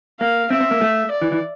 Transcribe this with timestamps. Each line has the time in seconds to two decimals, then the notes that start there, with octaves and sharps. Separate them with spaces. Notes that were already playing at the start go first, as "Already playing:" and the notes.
0.20 A#3 F5
0.50 C4 E5
0.61 C4
0.71 A#3
0.81 A3
1.11 D5
1.22 E3
1.32 E3